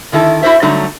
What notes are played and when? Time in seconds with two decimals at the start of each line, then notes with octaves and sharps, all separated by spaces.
0.12 D3 D#3 E4 A4
0.42 E4 F#4 A4 C5 E5
0.62 D3 F#3 G3 A3 D#4